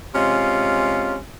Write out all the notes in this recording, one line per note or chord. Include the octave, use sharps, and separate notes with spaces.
C3 G#3 C#4 F4